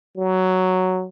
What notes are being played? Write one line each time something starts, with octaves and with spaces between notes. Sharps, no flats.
F#3